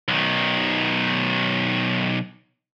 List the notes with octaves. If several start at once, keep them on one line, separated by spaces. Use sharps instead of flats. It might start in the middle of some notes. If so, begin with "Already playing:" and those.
B1 D#3